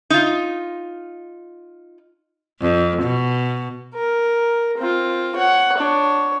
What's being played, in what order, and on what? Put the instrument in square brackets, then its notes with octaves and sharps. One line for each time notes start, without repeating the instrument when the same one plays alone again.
[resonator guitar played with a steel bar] D#4 F4
[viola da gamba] F2
B2
[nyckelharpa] A#4
C4 F4
C#5 F#5
D4 C#5